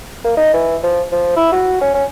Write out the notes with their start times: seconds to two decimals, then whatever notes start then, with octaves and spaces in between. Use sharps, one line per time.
0.25 A#3
0.37 D#4
0.54 E3
0.83 F3
1.12 F3
1.36 E4
1.52 F#4
1.81 C#4
1.95 C#4